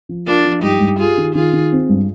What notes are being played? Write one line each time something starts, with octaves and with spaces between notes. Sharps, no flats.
F3
D4 F4 A#4
F3
G2 D#4 G4
G2
F4 G4 G#4
D#3
D#3 F4 G#4
D#3
C4
G2